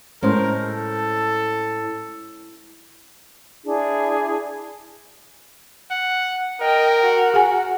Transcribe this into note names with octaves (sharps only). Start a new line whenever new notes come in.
A2 G#3 C#4 A#4 C5
A4
D4 E4 G#4
F#5
A#4 D#5 G5
F#4
G#4 F#5 G#5